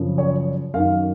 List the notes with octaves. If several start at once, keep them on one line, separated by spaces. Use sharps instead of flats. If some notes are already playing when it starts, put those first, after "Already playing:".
Already playing: F#2 C#3 F3
C#5
F#2 D#3 F5